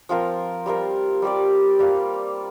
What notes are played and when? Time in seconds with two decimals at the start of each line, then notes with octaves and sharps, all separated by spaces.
0.09 F3 C4 F4 A#4
0.66 G3 C4 F4 A#4
1.22 G3 C4 G4 D5
1.79 G3 A#3 F4